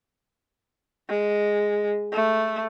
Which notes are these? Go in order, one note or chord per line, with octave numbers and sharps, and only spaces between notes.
G#3
A3